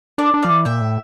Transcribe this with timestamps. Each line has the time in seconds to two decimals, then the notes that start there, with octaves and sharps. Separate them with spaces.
0.18 D4 A#4 D5
0.34 D4
0.42 F3 D5 F5
0.50 E3
0.65 A#2 E5 G5
0.81 A2